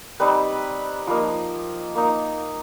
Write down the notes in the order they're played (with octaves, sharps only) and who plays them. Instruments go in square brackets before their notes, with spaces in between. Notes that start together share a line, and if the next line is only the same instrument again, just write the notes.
[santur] G3 C4 D#4 B4
F3 A#3 D#4
A#3 D#4